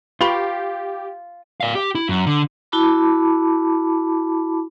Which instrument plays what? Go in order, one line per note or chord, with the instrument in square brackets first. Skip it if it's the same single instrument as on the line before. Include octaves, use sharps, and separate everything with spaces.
[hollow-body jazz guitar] F4 [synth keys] G4 [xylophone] B4 B5 C#6
[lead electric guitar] D5 F5
G4
E4
F#2
D3
[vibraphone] E4 F#4 A5 B5 D6